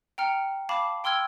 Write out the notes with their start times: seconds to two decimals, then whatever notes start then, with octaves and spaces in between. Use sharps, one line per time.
0.18 G5 A#5 F6 C#7
0.69 F5 A5 B5 D6
1.04 G5 C6 E6 F6 G#6